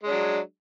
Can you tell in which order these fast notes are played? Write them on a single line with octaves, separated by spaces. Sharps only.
G#3 D4 F#3